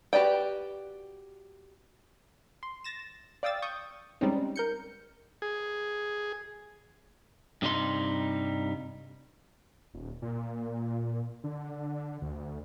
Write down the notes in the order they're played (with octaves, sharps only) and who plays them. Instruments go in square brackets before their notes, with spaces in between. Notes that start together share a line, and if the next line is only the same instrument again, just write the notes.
[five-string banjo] F#4 G4 B4 D5 G5
[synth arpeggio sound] C6
A6 A#6 E7
D5 F5 G5 D#6 E6 A6
C#6 D#6 G6
G3 G#3 C4 C#4 D#4
A#4 G6 C#7
[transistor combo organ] G#4
[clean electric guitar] G2 C3 G3 D#4 C6
[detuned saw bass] D#1
A#2
D3
D2